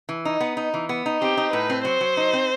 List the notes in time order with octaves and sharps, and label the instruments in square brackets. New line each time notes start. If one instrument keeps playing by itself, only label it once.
[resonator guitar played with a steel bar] E3
D#4
B3
D#4
E3
B3
D#4
[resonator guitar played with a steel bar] C4 [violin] G4
[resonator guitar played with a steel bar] D#4
[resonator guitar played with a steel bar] A2 [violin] B4
[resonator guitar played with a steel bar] C4
[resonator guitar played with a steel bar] F#3 [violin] C5
[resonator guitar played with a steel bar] F#3
D#4
C4